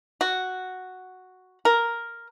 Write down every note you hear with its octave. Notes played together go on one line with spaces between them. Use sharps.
F#4
A#4